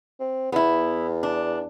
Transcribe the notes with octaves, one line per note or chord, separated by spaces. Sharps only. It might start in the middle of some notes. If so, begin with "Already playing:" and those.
C4
E2 B3 E4
D4